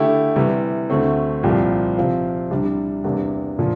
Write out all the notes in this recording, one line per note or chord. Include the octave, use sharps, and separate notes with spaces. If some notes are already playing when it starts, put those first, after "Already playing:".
Already playing: D3 A3 E4 G4
C3 E3 G3
D2 D3 A3 C4
C2 A#2 F3 C4 G4
C3 F3 C4 F4
C2 C3 G3 D4
E2 C3 G3 A#3 D4
A#2 F3